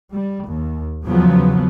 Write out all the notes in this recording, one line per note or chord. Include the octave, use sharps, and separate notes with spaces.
G3
D#2
E2 C#3 F3 F#3 B3